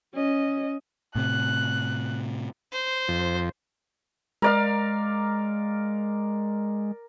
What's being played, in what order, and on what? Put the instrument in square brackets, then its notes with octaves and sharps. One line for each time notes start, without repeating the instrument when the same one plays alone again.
[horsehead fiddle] C#4 D#5
[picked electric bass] A2 C3 [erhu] F#6
[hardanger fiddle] C5
[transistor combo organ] F2
[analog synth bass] G#3 [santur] A#4 D5 F5